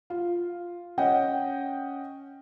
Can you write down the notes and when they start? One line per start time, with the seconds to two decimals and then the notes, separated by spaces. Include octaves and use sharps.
0.10 F4
0.98 C#4 D#5 F#5 G5